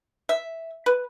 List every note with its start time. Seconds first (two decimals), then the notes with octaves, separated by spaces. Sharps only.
0.29 E5
0.86 B4